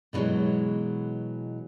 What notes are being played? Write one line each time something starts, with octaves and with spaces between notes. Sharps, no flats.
B2 D3 E3 F#3 G#3